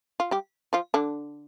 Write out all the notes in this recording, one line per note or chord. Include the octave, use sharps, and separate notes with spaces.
F4
G3 G4
F3 F4
D3 D4